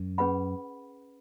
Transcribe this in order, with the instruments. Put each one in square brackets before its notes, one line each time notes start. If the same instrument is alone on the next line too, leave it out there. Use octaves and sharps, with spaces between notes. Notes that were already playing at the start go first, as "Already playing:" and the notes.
Already playing: [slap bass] F#2
[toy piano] C#4 G#4 B4 F#5 B5